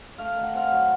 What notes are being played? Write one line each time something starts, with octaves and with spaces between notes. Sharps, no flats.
A3 F5
D#3
F#5
C4 F5
F#5
F#3